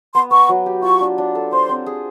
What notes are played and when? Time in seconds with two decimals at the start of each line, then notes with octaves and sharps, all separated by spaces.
0.14 B3 C6
0.31 B3 C#6
0.49 F#3
0.66 G4
0.82 F4 C#6
1.01 D4
1.18 D4
1.35 A4
1.52 C5 C6
1.69 C4
1.86 G#4